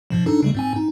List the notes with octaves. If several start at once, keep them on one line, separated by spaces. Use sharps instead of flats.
G#2 B2 F3
D4 D#4 A4
C#3 G3 A3
G#2 C4 G#5
D#4